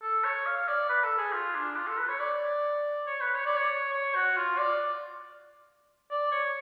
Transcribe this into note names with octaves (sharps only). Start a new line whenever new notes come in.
A4
C#5
F5
D5
B4
A4
G#4
F4
D4
F4
A4
B4
C#5
D5
C#5
B4
C#5
D5
C#5
C#5
F#4
F4
D5
D5
C#5